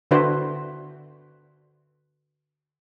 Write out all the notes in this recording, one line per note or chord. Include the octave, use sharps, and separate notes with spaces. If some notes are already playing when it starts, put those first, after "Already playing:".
D3 D4 E4 F#4 B4 C5